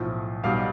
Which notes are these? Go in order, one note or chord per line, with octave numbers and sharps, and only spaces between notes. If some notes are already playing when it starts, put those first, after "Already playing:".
Already playing: B1 A2 F3
B1 B2 G3 F5